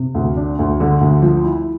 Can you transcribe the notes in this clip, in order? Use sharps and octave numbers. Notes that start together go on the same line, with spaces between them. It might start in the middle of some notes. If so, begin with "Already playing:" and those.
Already playing: C3
D2
D4
D2
D3
D2
F3
E4